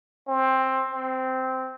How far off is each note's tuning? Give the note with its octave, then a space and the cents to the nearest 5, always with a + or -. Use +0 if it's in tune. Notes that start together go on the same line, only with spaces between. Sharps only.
C4 +10
C4 -10